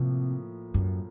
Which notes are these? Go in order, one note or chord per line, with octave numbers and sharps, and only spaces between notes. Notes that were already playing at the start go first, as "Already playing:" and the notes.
Already playing: A2 C3 F3 A#3
F#2